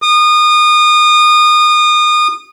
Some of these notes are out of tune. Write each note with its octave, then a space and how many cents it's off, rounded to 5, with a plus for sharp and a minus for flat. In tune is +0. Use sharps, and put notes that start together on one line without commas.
D#6 -30